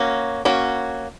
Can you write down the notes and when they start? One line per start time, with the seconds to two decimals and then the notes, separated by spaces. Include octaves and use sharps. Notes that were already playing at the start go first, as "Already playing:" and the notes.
Already playing: A#3 C#4 F#4
0.45 A#3 C#4 F#4